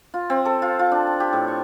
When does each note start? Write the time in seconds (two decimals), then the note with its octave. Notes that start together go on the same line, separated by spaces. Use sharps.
0.14 F4
0.30 C4
0.45 A4
0.62 F4
0.79 F4
0.92 D4
1.07 G5
1.20 G4
1.33 A2
1.48 C#6